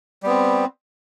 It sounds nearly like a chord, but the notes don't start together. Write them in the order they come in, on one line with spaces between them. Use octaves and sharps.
G3 B3 C4